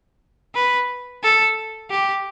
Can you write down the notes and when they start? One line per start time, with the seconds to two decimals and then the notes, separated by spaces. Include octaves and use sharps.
0.55 B4
1.23 A4
1.91 G4